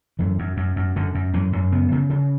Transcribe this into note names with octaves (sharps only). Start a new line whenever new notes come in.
F#2 E3
F#2
F#2
F#2
F#2 D3
F#2
F#2 E3
F#2
C#3 B3
C#3
C#3